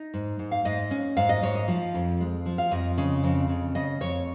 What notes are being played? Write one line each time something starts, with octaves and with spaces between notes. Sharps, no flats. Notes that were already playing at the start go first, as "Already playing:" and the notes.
Already playing: D#4
G#2
G#2
F5
G#2 D#5
C#4
G#2 F5
D#5
G#2 C#5
D#5
F3 F5
F2
G#3
F3
F5
F2 D#5
C#3
F2
C#3
C#3 D#5
F2 C#5